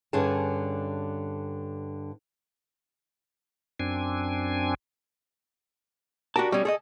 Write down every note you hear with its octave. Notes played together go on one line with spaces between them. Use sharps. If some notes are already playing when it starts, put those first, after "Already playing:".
G2 D3 C#4 G#4 A5
F#2 C4 D4 G#5
D4 F#4 G4 A#4 A5
B2 G3 C#4
G#4 A4 C5 D#5